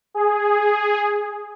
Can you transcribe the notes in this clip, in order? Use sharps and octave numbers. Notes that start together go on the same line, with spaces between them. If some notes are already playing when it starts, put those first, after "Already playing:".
G#4